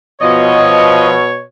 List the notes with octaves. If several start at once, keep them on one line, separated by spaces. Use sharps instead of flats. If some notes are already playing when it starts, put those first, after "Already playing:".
B2 F3 C#5 D#5